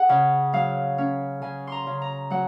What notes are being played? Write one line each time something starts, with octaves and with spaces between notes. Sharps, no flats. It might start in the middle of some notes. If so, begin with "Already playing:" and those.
Already playing: G#4 F#5
C#3
F#3 F5
C#4
C#3 G#5
A#5 C6
C#3
A#5
F#3 F#5